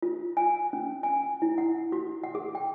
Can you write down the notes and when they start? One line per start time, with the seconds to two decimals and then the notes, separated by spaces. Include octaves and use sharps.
0.02 F4
0.37 G#5
0.73 C#4
1.03 G#5
1.42 E4
1.58 F#5
1.92 F#4
2.24 F#5
2.35 G#4
2.55 G5